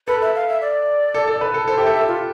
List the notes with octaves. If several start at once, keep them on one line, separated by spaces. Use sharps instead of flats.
A4 B4
E5
F5
E5
D5
A4
A4
B4
A4
A4 C5
G4 E5
A4
E5
F4